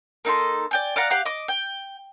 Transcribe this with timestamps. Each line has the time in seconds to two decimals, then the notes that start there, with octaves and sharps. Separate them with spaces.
0.25 A#3 D#4 A4 C6
0.71 D5 G5 G#5
0.96 D5 F5 F#5 A#5
1.11 G4 F5 F#5
1.25 D#5 D6
1.48 G5